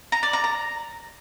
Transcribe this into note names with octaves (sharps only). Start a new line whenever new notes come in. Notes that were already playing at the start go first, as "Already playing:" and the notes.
A#5
D5
A#5
A#5